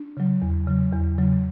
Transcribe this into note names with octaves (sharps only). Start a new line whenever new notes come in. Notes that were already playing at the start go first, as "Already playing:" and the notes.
Already playing: D4
C#3 F#3
E2
C#3 F#3
E2
C#3 F#3